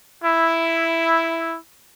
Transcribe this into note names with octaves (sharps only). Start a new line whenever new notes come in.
E4